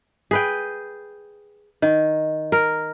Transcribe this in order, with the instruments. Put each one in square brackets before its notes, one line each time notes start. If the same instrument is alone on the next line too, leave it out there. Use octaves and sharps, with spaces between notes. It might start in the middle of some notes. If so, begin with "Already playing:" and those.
[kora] G#4 B4 G5
D#3
A#4